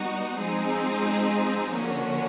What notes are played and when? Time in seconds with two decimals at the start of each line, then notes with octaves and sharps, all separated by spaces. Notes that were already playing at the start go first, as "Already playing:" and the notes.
Already playing: G3 B3 D#4 F#4
0.35 F3 G#3 C4 D#4 G#4
1.71 D3 F3 A#3 C#4 F#4